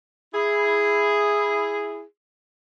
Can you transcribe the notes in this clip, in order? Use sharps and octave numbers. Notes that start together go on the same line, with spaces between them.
E4 G#4